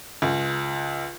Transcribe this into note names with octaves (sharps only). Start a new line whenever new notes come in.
C#2